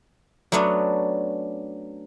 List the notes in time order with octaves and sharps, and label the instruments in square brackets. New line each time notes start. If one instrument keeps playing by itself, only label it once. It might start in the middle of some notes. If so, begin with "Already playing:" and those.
[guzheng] F#3 A3 B3 C#4 D4